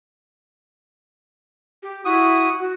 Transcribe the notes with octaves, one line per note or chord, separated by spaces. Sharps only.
G4
E4 F#4 D#6
F#4